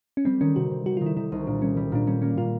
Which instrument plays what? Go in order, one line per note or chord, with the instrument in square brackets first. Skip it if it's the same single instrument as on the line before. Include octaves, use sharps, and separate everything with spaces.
[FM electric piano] C#4
[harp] G3 [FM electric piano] C4
[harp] D#3 [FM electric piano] C#4
[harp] C3 [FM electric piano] F#4
[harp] C3
[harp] G3 [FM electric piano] F#4
[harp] D#3 [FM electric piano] F4
[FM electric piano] E4
[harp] D#3 [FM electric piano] E4
[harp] C2 [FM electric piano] D#4
[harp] A#2 [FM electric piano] D4
[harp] G3 [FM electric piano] C#4
[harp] G3
[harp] A#2 [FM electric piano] D4
[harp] G3 [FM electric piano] C#4
[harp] A#3 [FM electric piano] C#4
[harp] A#2 [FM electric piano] F4